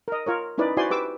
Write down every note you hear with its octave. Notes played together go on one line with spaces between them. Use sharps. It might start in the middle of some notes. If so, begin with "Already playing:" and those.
A#4 D#5
F4 A#4 C#5
C#4 D#4 E4 B4 D5
E4 F#4 C5 D5 G#5 C6
G4 B4 D6 E6